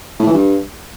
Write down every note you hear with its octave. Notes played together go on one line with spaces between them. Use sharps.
A2
E3
G2